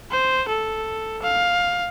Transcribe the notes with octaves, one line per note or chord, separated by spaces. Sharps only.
C5
A4
F5